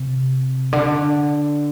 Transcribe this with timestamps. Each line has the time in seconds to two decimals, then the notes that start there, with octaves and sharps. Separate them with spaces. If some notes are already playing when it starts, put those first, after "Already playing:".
Already playing: C3
0.73 D3